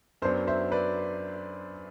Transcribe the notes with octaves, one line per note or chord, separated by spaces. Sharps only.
F#2 F#3 B3 D4 C5
C5 E5
B4 D5